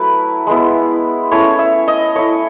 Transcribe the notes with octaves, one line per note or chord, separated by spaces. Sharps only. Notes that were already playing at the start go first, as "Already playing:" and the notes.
Already playing: F#3 A3 E4 B4
G#3 B3 E4
A3 C#4 E4 C#5
E5
D#5
A3 E4 C#5